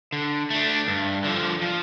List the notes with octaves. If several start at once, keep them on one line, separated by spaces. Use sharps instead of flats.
D3
A3 D4
G2
D3 F3
F3